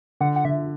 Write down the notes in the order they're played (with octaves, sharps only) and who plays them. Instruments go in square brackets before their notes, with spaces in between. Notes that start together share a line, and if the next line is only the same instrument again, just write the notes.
[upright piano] D3 [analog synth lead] F#5
[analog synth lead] F#5
[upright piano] D3 [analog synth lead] E5